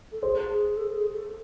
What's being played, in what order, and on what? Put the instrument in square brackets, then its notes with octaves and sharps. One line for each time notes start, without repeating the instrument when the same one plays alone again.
[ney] A4
[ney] G#4 [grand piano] C5
[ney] G#4
A4
G#4
G#4
A4